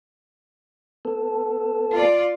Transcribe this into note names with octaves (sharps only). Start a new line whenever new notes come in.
B3 A4
F4 D5